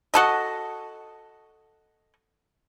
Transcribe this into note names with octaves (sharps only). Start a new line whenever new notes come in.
F#4 A4 D#5